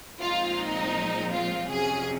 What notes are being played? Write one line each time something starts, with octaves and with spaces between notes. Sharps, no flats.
A#2 F3 G#3 C4 D#4 F4
D#4
F4
F2 C3 F#3 C#4 G#4